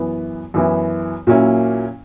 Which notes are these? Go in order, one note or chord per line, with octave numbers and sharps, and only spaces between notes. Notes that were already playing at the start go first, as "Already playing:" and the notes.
Already playing: F#2 E3 B3 E4
F#2 E3 B3 E4
A#2 F#3 A#3 C#4 E4